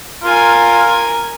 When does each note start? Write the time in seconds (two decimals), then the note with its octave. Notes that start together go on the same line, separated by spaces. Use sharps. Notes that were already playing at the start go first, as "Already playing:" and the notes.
0.24 F4 A#4 G#5